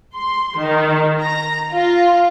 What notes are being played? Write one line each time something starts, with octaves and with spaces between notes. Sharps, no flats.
C6
D#3
A#5
F4